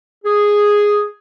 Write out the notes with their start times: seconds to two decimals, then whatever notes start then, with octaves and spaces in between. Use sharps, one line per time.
0.25 G#4